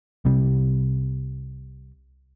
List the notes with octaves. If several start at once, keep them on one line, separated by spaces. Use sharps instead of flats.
C2 C3 G3